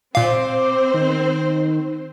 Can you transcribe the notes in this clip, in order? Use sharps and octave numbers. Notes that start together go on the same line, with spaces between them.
A#2 C4 C5 F5 D6
D#3